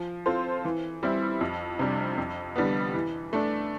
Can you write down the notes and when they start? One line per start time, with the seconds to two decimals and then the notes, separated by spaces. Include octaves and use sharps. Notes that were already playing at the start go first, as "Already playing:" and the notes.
Already playing: F3
0.26 C4 F4 A4 C5
0.65 E3
1.03 G3 C4 E4
1.41 F2
1.79 C3 G3 D4
2.17 F2
2.56 D3 G3 B3
2.94 E3
3.33 A3 D4